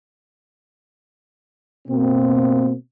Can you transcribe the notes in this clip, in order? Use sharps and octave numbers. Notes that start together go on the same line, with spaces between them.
B2 A#3 C4